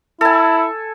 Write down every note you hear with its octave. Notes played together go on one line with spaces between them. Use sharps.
E4 A4 G#5